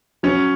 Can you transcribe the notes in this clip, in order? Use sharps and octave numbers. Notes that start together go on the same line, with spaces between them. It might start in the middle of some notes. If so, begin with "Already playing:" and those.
F#3 C#4 C#5